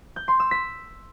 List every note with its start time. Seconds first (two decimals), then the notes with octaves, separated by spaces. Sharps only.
0.16 G6
0.28 C6
0.40 E6
0.51 B6